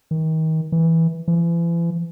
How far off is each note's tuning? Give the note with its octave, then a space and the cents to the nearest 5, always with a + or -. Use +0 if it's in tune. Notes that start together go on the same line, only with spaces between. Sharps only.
D#3 +35
E3 -10
E3 +40